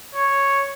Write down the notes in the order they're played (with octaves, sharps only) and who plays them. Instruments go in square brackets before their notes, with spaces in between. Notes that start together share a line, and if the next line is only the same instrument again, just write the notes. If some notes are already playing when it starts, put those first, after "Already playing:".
[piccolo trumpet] C#5